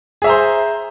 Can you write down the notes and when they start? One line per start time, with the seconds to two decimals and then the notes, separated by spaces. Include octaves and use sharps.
0.22 G#4
0.24 E5
0.27 A#5
0.29 C5